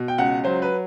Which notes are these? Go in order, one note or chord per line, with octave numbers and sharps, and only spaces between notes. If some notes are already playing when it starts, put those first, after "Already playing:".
Already playing: B2
G5
C#2 F#5
F#3 C5
B4